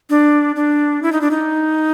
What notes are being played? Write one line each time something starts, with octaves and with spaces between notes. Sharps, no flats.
D4
D4
E4
D#4
D4
D#4